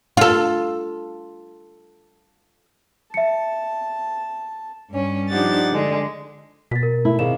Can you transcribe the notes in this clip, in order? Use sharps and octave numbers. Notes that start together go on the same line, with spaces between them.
F4 A4
E5 A5 C#7
G2 C#4
F3 D4 D#4 G4 F#5 A6
D3 G#3
B2 A6 B6
A#4
A3 E4
C3 D#3 G#4 F5 E7